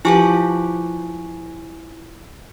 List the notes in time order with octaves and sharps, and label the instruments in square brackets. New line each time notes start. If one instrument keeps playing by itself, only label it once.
[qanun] F3 G4 B4 [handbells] E4 G#5 C#6